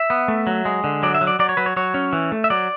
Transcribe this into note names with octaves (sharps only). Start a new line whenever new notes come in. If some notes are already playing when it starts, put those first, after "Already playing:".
Already playing: E5
B3
A3
F#3
G#3
D3
F#3 D5
E5
F#3
D5
F#3 D5
C#5
F#3 B4
C#5
F#3 C#5
C#4
E3
A3
E5
F#3 D5